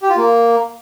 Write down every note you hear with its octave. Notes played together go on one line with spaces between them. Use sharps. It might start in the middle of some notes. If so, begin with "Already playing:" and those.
G4
F4
A#3